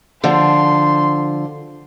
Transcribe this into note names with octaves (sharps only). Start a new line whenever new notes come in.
D3 F3 C6